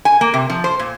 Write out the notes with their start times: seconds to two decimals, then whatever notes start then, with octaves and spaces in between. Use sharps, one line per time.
0.05 G#5
0.21 A#3
0.34 C3
0.50 F3
0.64 C5
0.79 A#2